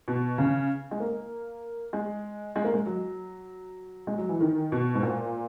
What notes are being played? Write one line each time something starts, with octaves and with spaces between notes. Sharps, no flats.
B2
C#3
G#3
A#3
G#3
G#3
A#3
G#3
F#3
G#3
F#3
E3
D#3
B2
G#2
A#2